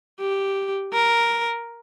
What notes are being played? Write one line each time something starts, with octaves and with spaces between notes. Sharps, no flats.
G4
A#4